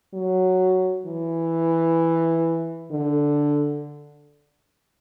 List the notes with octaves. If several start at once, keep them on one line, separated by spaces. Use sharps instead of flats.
F#3
E3
D3